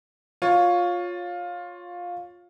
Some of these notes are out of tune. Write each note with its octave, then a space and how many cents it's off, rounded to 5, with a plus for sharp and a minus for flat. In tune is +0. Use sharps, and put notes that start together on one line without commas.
F4 +15 C#5 +0